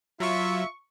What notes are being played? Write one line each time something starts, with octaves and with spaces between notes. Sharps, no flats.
F#3 F4 E5 C#6